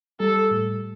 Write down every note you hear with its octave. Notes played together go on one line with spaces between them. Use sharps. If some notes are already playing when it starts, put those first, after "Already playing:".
G3 A4
A2